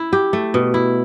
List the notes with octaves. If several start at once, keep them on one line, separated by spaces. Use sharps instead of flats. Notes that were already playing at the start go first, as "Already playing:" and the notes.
Already playing: E4
G4
A3
B2
E4